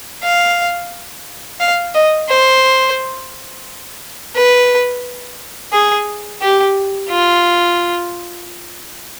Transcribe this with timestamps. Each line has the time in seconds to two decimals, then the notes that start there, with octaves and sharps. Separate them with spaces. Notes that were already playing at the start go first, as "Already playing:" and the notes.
0.23 F5
1.60 F5
1.94 D#5
2.29 C5
4.35 B4
5.73 G#4
6.42 G4
7.10 F4